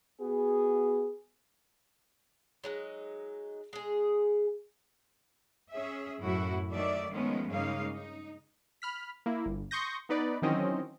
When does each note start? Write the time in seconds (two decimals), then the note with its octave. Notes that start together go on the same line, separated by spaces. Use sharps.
0.20 B3 F#4 G#4
2.64 F#3 G#3 D#4
3.73 G#3 G#4
5.71 C#4 G#4 E5
6.20 F#2 A2 E4 F#4
6.71 D#3 F#3 A3 D5 E5
7.11 D#3 F3 G#3 A3 B3 C#4
7.48 G2 C#3 G#3 A#3 D#4 F5
7.95 D#4
8.82 B5 F6 B6
9.26 A#3 E4
9.46 G1
9.71 C6 C#6 D#6 G6 A#6
10.09 B3 D#4 B4 D5
10.42 D#3 E3 F#3 C4 C#4 D#5